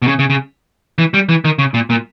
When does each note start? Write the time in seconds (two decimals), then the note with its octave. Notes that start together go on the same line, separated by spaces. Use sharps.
0.02 B2
0.07 C#3
0.19 C#3
0.30 C#3
0.98 E3
1.14 G3
1.29 E3
1.45 D#3
1.59 C#3
1.74 A#2
1.90 A#2